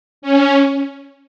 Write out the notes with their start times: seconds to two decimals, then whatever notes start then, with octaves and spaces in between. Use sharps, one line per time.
0.22 C#4